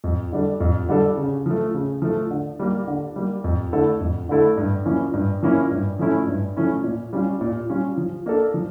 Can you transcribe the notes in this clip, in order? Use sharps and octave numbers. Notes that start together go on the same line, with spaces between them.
F2
D3 G3 D4 A4
F2
D3 G3 D4 A4
C#3
F3 A3
C#3
F3 A3
D3
G3 A#3
D3
G3 A#3
F2
D3 A3 E4 A4
F2
D3 A3 E4 A4
G2
F3 A#3 C#4 E4
G2
F3 A#3 C#4 E4
G2
F3 A3 C#4 E4
G2
F3 A3 C#4 E4
A#2
G3 C#4 F4
A#2
G3 C#4 F4
F3
A#3 D4 A4
F3